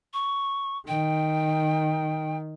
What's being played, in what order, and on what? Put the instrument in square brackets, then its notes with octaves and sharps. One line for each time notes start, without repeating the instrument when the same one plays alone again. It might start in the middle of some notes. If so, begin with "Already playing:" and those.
[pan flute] C#6
[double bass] D#3 [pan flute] G5